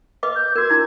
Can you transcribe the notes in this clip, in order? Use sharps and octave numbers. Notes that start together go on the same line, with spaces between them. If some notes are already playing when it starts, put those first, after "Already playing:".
B4 D#5 D6
G6
F#4 A#4 G#6
D4 E4